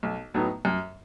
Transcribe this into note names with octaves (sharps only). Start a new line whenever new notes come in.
B1
A2 F#3 B3 D#4
F#2